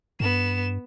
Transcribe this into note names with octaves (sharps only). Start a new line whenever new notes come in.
G2 B3 E7